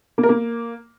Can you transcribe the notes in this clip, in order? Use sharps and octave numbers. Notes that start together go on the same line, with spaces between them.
A#3
A#4
A#3